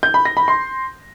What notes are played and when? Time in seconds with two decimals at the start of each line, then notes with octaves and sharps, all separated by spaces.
0.03 G6
0.14 B5
0.25 A#6
0.37 B5
0.48 C6